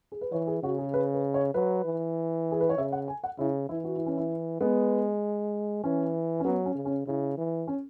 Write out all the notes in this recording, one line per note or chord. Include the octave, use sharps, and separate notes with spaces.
G#4
B4
E3 C#5
G#4
C#3 F#4
G#4
B4
B4
C#5
F#3 B4
E3
G#4
B4
C#5
C#3 E5
F#5
G#5
F#5
C#3 E4
E3 E4
F#4
E4
C#4
E4
G#3 B3
E3 C#4
C#4
F#3 B3
C#4
C#3
C#4
C#3 E4
E3
C#4